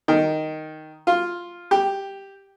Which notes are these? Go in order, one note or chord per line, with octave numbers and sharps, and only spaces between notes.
D#3
F4
G4